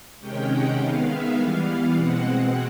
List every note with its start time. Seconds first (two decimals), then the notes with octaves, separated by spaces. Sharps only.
0.20 C3 D#3 G#3 C#4 G5
0.49 F#5
0.77 D#3 G#3 B3 F5
1.07 E5
1.35 E3 G3 B3 F5
1.93 B2 G#3 C4 F#5